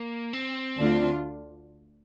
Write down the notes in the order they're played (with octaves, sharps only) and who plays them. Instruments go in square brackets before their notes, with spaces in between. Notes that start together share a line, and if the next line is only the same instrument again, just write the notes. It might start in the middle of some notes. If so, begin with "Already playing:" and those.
Already playing: [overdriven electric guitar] A#3
C4
[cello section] D2 D3 A3 D4 F4